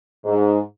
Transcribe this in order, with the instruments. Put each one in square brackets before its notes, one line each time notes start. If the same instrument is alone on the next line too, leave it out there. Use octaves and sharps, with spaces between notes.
[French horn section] G#2